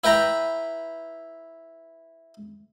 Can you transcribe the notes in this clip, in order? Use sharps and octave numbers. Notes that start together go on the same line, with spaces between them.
E4 B4 G5 A#5